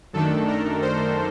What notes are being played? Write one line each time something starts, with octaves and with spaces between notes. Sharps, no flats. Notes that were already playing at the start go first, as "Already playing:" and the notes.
F#2 D#3 A3 D4 A4
A#4
C5